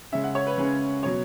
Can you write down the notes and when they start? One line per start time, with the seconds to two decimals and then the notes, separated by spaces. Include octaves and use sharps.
0.12 C#3 G#3 C#4 E5
0.24 F#5
0.35 C#5
0.46 B4
0.57 C#3 G#3 C#4 B4
1.03 B2 F#3 C#5